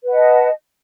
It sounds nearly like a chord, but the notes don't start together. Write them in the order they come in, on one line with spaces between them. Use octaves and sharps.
B4 F#5 D#5 A5